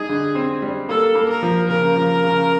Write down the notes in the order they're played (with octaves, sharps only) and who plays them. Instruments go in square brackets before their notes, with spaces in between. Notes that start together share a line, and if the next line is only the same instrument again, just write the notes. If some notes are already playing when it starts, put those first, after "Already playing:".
Already playing: [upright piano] G3 D#4 [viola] G#4
[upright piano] D3
C4
G3
[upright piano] A#3 [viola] A4
[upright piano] A#3
[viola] A#4
[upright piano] F3
[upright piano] C#3 [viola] A#4
[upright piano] F3
C#3